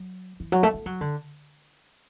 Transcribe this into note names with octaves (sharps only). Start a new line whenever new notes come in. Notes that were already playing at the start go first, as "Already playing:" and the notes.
Already playing: F#3
E3
F#3
A3
A3
F#3
D3